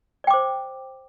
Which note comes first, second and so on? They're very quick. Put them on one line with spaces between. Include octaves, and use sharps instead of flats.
D5 G5 D6 C5